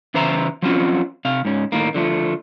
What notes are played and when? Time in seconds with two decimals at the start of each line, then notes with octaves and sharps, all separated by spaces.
0.14 C#3 E3 B4 C5 E5 A#5
0.62 F3 F#3 C4 C#4 F4 F#4
1.25 C3 F5
1.45 G#2 C#4
1.72 A2 D#3 A#3
1.95 D3 F3 A3